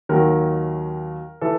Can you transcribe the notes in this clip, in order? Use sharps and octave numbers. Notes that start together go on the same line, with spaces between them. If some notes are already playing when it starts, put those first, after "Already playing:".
D#2 D#3 F#3 A#4
E3 A4